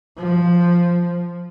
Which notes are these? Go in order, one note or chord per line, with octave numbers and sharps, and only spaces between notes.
F3